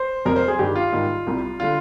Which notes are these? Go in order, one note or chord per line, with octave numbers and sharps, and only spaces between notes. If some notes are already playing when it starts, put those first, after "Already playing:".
Already playing: C5
F2 C3 G3 A#4
C5
G#4
G2 D#3 G3 G4
F4
G#2 D#3 G3
C2 C3 G3
D3 G3 F4